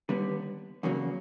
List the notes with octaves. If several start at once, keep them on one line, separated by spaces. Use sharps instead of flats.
D#2 D3 G3 B3
E2 C#3 F#3 A#3